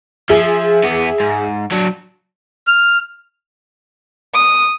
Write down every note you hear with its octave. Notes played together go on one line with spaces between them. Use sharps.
F3 G#4 E5
E2 B3
G#2
F#3 D4
F6
D#6